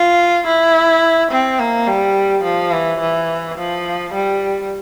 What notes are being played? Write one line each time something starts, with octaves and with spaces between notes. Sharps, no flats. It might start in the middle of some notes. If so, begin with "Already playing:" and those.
Already playing: F4
E4
C4
A#3
G3
F3
E3
E3
F3
G3